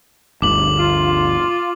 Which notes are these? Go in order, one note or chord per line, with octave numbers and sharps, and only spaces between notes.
G1 D2 D6 F#7
F4